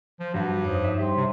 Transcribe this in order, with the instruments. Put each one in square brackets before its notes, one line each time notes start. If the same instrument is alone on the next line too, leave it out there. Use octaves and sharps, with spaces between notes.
[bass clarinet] F3
[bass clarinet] G2 [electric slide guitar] F#3 G3 F#4 [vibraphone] F#5
[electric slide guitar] F2 [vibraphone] D#4 C5 C#5
[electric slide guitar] E5
[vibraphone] G3 C5 C6 [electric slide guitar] G4 G5
[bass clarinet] C3